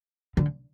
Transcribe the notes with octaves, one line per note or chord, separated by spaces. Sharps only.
D3